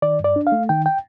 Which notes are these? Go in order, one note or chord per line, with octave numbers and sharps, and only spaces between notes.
D#3 D5
G2 D5
D4
F5
A3
D#3 G5
G5